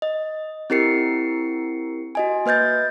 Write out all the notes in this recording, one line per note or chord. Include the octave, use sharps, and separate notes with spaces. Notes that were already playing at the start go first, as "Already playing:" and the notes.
D#5
C4 E4 G4 A#4 C7 C#7
F#4 D#5 G#5
A#3 B4 D#5 G6 A6